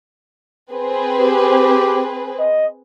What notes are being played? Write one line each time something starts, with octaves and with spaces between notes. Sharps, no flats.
C4 G#4 B4
G4
D#5